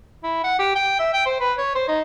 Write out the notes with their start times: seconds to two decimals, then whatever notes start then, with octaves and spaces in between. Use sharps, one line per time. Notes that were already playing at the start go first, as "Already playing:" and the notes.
0.23 E4
0.44 F#5
0.59 G4
0.75 G5
0.99 E5
1.13 G5
1.26 C5
1.40 B4
1.58 C#5
1.75 C5
1.88 D#4